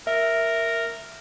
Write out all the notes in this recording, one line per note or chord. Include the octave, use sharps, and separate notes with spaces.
A#4 E5